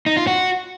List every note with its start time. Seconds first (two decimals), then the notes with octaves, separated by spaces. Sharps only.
0.06 D#4
0.17 F4
0.27 F#4